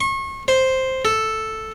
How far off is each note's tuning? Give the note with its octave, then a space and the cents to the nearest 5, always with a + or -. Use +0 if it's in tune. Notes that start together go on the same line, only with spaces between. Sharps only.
C#6 -35
C5 +0
A4 +0